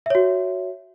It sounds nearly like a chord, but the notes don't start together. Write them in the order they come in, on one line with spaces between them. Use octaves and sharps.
E5 C#5 F#4